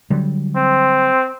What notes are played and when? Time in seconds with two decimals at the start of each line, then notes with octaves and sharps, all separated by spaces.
0.10 D3 F#3 G3
0.56 C4